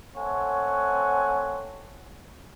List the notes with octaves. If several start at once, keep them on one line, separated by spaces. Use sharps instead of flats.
A3 C4 C#5 F#5 G#5